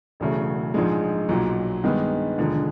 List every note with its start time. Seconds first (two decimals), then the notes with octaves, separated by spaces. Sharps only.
0.20 E1 E2 C#3 F#3 A3
0.74 A#1 G#2 F3 G#3
1.29 B1 A#2 F#3
1.84 G2 D#3 G#3 B3
2.38 E1 D#2 D3 F3 G#3